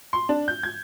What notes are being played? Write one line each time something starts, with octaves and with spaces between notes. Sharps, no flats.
C6
D4
G6
G#6